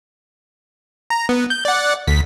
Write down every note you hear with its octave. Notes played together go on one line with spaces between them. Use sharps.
A#5
B3
G6
D5 F#5
D2 B6